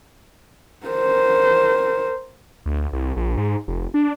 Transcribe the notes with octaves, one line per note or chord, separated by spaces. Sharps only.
A#4 C5
D2
C2
A#1
G#2
F1
D4